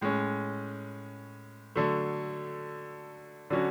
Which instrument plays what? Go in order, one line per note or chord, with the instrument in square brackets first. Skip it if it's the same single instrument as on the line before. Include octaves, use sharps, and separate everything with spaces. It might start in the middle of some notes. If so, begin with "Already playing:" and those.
[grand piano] A2 G#3 C#4
D3 F#3 A3
D3 F#3 C#4 F#4